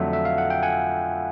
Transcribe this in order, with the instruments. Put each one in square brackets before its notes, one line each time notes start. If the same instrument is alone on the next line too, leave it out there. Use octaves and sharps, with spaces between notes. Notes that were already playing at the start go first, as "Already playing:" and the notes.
Already playing: [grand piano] F2 D3 F#3 A3 D4 [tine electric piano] E5 F#5
[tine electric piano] E5
F5
F#5
G5
F#5 G#5